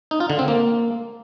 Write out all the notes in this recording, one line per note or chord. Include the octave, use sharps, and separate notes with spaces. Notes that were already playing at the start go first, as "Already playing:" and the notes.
D#4
F4
D3
C4
A#3